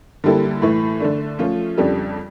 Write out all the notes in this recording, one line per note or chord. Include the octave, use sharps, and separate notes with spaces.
D3 G3 A#3 E4 A4
A2 E3 A3
D3 A3 D4
F3 A3 C#4 F4
F2 C#3 G3 D4 A4